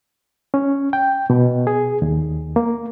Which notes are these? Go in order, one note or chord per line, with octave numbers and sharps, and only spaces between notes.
C#4
G5
B2
G#4
D#2
A#3